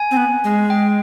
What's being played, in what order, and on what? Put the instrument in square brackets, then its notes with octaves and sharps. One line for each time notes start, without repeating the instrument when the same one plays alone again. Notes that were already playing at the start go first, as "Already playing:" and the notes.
Already playing: [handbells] G#5
[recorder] C4
B3
G#3
[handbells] G5